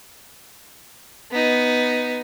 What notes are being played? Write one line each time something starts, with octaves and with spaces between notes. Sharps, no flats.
B3 D#4